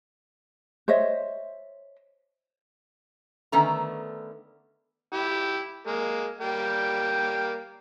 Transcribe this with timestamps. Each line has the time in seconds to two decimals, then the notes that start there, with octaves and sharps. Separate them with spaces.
0.88 C5 C#5 D#5 E5
3.52 D3 D#3 A3 B3 C#4 A#5
5.13 E4 G4
5.87 G#3 A#3
6.41 G3 A#3 G5